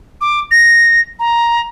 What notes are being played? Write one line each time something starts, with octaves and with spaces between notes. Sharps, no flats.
D6
A#6
A#5